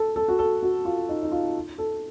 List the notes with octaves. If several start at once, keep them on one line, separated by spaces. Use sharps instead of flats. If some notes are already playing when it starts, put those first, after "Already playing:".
Already playing: A4
A4
F#4
A4
F#4
F4
D#4
D#4
F4
A4